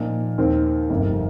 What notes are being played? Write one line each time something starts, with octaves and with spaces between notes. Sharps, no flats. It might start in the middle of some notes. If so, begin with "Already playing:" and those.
Already playing: A#2 F3 D#4
D#2 D#3 C4
G1 F2 C3 D#3 A#3